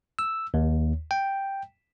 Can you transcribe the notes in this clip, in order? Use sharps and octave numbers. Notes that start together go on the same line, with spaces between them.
E6
D#2
G5